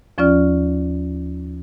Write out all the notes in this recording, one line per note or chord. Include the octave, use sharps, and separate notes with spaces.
D#2 F3 C#4 F4 D5 F6